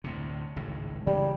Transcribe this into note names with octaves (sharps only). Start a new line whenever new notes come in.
D2 A2 C3
G#1 C#2 A2
C#3 E3 F#3 G3